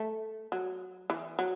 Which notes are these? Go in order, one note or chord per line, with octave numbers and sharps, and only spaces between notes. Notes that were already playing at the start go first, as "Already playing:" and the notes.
Already playing: A3
F#3
E3
F#3